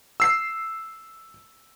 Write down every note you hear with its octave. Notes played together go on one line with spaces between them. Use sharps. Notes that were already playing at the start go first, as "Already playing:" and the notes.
E6 C7